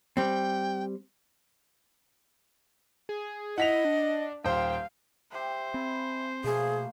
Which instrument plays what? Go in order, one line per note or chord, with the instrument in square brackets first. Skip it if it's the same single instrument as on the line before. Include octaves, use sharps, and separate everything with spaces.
[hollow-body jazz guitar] G3 C4 [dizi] G5
[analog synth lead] G#4
[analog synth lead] E4 [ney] D#5 [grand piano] F#5 B6 F7
[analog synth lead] D4
[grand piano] D#1 C5 [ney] F5 [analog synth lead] G5
[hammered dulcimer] G4 A5 [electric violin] C5 [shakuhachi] E5
[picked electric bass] C4 [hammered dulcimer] G#5 B5
[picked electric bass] B2 [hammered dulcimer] F3 A3 A#3 [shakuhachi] G#4